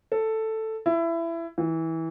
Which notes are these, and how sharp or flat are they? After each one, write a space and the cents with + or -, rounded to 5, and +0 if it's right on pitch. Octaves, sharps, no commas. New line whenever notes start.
A4 +5
E4 +20
E3 -20